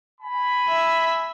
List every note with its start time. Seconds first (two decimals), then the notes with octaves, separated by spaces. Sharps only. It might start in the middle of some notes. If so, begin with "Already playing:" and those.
0.21 G#5 B5
0.68 E5